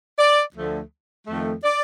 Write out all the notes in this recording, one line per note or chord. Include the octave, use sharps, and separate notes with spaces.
D5
D2 D3 F3 A3
F2 D#3 A3
D5